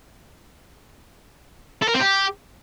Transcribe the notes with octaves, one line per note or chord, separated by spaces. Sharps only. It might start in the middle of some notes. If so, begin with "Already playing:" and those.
A4
A#4
C4
G4